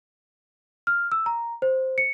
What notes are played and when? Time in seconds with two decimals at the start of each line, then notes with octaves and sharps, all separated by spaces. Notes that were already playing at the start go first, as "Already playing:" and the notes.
0.87 F6
1.12 E6
1.26 A#5
1.62 C5
1.98 C#7